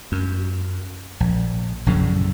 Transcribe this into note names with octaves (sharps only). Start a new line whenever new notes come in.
F#2
A#1
A#1 F#2 A2 C#3